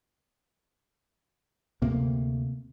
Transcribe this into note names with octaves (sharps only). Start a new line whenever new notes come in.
D2 C3 A#3